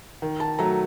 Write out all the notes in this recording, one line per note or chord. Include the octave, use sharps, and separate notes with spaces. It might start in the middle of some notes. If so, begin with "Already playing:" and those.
D#3
A5
F#3 A3 A#5